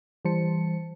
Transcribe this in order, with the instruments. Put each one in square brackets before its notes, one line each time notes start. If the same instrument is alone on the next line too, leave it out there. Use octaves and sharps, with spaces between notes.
[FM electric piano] E3 G3 C5 A5 C#7